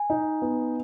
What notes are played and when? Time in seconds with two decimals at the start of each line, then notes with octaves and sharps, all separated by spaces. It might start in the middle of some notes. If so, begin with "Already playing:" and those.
Already playing: G#5
0.10 D#4
0.42 B3